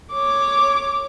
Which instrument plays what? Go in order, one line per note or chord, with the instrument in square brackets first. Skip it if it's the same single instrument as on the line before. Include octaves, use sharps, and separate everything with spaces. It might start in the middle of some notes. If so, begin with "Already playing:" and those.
[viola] C#5 D6